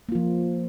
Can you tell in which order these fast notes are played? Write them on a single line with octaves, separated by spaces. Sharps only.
A#3 F4 F3